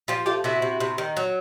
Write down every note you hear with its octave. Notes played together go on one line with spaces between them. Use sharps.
F3 F4 G4
A3 F4 G4
C3 E4 F#4
C3
C3
D#3
F#3